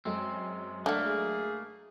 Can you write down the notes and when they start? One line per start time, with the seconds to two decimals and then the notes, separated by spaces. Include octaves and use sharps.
0.05 F#2 G#3 C4
0.86 D3 A3 A#3 D4 F#5
1.03 G#4